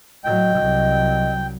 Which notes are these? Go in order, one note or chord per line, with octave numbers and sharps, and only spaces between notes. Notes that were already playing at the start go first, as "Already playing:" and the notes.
A2 F#3 D#5 G5
C2 F#3